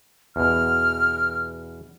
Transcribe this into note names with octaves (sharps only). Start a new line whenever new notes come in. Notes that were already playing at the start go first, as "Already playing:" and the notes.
E2 B2 F6